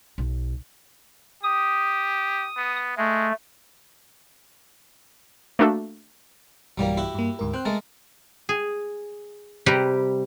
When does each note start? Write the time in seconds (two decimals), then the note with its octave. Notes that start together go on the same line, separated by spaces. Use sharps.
0.18 B1
1.43 G4 D#6
2.57 B3
2.98 G#3 A3
5.59 A3 A#3 D4 F#4 A4
6.78 B1 G2 E3 F#3 G3 A#3
6.97 E4 F#4 G4
7.14 G2 A#3
7.39 D2 G#2 A#4
7.54 C4 G5 F#6
7.65 G#3 A3 A#4 A6
8.49 G#4
9.66 C3 G3 G4 B4 A#5